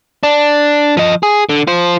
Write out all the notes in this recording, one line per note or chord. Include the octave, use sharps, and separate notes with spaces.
D4
F3 D#5
G#4
D3
F4 C5